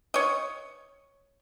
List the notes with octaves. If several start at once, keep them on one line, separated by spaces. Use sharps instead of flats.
C#5 D#5